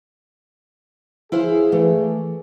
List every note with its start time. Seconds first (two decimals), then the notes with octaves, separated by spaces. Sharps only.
1.32 E4 G#4 C5 F5
1.72 E3 A3